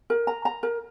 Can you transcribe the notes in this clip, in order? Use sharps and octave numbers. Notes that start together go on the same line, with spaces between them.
A#4
A#5
A#5
A#4